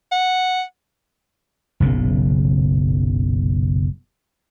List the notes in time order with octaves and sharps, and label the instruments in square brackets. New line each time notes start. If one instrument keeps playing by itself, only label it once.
[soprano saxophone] F#5
[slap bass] F#1 B1 A#2 C#3